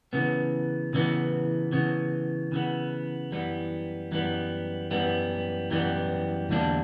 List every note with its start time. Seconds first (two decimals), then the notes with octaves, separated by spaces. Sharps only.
0.13 C#3 E3 B3
0.93 C#3 E3 B3
1.72 C#3 E3 B3
2.52 C#3 E3 B3
3.32 F#2 E3 G3 B3
4.12 F#2 E3 G3 B3
4.91 F#2 E3 G3 B3
5.70 F#2 E3 G3 B3
6.49 E2 D3 G3 A#3 D4